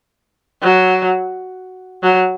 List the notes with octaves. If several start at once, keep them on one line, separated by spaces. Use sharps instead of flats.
F#3
F#3